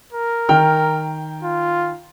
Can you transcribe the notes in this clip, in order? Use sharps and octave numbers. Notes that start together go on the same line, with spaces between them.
A#4
D#3 G5 F6
F4